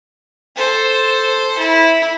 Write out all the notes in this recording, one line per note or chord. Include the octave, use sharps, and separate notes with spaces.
A4 C5
E4